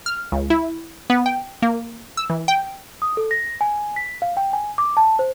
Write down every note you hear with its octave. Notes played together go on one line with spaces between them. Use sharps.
F6
C#2
E4
B3
G5
A#3
E6
E3
G5
D#6
A4
A#6
G#5
B6
F5
G5
G#5
D6
A5
C5